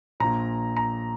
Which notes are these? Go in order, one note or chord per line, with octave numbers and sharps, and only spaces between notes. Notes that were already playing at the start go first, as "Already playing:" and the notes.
A#1 A#2 A#5
A#5